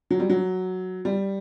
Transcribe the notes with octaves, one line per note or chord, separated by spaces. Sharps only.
F#3
G3
F#3
G3